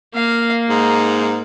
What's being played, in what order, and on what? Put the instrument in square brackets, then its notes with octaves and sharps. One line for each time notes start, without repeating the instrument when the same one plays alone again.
[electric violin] A#3 [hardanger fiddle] F5
[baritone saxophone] G#2 [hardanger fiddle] D#4